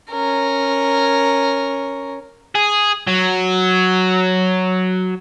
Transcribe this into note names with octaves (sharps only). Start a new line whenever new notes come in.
C#4 A#4
G#4
F#3